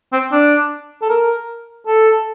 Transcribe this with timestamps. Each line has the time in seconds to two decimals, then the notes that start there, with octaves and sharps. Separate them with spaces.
0.13 C4
0.32 D4
1.02 A4
1.09 A#4
1.87 A4